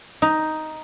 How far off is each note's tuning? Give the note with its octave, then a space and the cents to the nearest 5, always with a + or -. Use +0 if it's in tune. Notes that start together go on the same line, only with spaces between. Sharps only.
D#4 +5